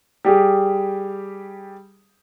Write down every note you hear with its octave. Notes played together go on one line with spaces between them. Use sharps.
G3 G4 G#4